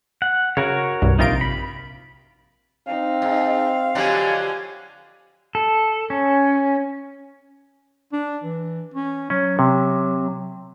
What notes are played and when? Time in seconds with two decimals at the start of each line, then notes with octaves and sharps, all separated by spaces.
0.22 F#5
0.57 C#3 F#4 A#4 C#5
1.02 C2 G2
1.19 A#1 C3 D#4 F4 A#4 D7
1.41 B5
2.88 C4 D#4 F5
3.22 G#2
3.95 F2 D3 F#3 G4 G#5
5.55 A4
6.10 C#4
8.13 D4
8.44 E3
8.94 C#4
9.30 F#3 C#4
9.59 C3